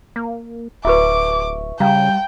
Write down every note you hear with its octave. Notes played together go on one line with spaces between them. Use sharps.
A#3
D1 E4 F#4 B4 E5 C#6 D6
C#3 G3 F5 G5 A#5